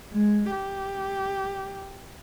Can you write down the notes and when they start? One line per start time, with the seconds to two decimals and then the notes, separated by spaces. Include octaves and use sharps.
0.12 G#3
0.51 G4